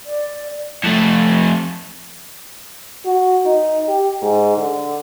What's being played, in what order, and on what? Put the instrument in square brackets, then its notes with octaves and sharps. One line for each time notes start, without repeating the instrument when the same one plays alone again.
[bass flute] D5
[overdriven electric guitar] F2 A3
[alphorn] F#4
D#4
G4
G#2
D3